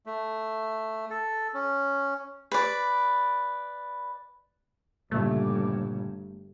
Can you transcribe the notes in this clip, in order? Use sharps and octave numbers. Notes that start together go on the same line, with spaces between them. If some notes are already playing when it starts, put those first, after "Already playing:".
A3
A4
C#4
B4 D5
G1 G2 A#2 C#3 A3 E5